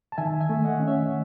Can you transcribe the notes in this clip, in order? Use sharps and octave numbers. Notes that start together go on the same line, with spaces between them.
A5
D#3 E5 G#5
E5 G#5
A3
D#5 F#5
C#4
C#5 E5